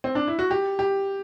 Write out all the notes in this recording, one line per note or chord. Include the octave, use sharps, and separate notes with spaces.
C4
D4
E4
F#4
G4
G4